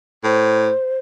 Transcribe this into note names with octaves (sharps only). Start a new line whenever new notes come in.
A2 C5